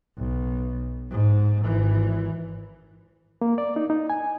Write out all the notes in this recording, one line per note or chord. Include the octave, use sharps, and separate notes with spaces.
B1
G#2
G#1 E3
A#3
D5
D#4
D#4
G#5